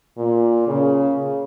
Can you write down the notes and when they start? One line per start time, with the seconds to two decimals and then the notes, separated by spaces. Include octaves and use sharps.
0.18 A#2
0.67 C#3